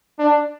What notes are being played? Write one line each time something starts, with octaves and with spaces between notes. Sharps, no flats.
D4